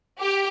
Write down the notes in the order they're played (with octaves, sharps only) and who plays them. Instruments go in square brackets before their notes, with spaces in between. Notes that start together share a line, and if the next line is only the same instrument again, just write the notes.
[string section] G4